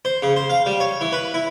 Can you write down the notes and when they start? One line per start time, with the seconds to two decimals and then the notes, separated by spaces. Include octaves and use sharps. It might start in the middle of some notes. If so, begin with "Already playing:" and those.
0.05 C5
0.22 C#3
0.36 C5
0.50 F5
0.66 G3
0.80 C#5
1.01 E3
1.13 B4
1.34 E4